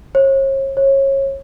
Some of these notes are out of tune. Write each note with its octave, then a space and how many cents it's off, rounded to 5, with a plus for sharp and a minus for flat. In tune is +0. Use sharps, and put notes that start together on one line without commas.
C#5 -40
C#5 -25